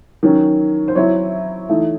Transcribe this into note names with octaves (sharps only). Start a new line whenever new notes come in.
D#3 F#3 C#4
C5
F#3 C4 E4 C#5
E3 A3 D#4